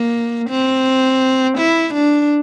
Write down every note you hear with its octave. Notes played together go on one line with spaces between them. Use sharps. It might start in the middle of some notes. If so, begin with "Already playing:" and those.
Already playing: A#3
C4
E4
D4